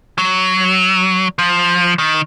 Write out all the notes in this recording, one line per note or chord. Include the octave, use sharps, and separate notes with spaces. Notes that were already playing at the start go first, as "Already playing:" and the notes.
F#3
F3
D#3